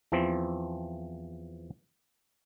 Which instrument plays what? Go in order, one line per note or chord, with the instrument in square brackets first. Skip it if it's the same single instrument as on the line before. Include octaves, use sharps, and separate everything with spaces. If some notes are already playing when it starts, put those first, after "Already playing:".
[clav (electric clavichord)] E2 E3 F3 C4